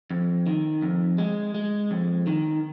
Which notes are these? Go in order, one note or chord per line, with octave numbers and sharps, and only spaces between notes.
F2
D#3
F2
G#3
G#3
F2
D#3